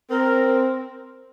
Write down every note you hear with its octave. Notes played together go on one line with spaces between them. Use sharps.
C4 A#4